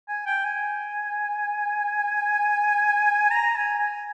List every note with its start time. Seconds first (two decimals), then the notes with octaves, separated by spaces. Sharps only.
0.08 G#5
0.27 G5
0.44 G#5
3.31 A#5
3.56 G#5
3.79 G#5